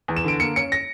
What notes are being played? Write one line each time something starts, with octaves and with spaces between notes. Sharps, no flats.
E2
E7
D3 D7
A#3 C#7
C#4 C#7
A#6